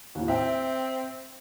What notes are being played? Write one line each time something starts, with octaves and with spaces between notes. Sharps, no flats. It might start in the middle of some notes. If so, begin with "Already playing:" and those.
D#2 A2
C4 E5 G5